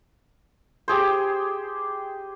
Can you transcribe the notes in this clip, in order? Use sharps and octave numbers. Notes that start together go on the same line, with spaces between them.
G4 G#4 C5